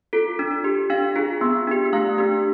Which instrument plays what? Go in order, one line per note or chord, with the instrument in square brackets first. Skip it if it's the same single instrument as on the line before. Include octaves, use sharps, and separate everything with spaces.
[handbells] F4 A4
D4
G4
D4 F5
F4 G#4
B3
D4 G4
A3 F5
D4 G4